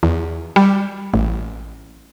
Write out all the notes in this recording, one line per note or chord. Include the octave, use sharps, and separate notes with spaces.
E2
G3
A1